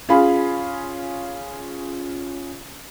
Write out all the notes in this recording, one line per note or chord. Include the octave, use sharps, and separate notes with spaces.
C#4 F4 G#4 F5 B5